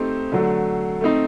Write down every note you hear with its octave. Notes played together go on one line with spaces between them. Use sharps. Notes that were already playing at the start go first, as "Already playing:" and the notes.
Already playing: A3 C4 D#4 G4 C5
D3 F#3 A3
A3 C4 D#4